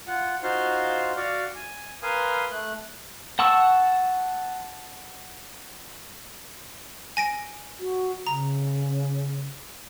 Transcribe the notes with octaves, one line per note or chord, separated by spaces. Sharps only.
F4 F#5
D#4 F4 F#4 C5 F5 C6
F#4 D5 F5 F#5
G#5
A#4 B4 F5 G#5 C6 D#6
A3 F#6
F#5 A5 C#6 E6
G#5 A#6 D7
F#4
C#3 A#5